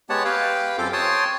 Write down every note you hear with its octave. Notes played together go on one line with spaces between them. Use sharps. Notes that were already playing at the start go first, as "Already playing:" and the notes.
G#3 B3 G4 C#5 F#5 A5
G4 B4 F5 G5
F#2 C4 F4 A4 G5 D6
C#5 G5 A5 C6 D#6